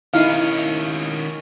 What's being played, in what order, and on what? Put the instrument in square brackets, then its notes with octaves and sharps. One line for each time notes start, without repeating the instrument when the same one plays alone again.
[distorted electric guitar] D#3 C#4 [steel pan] D#4 E4 F5